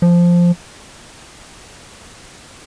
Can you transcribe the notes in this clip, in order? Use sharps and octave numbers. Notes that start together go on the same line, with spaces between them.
F3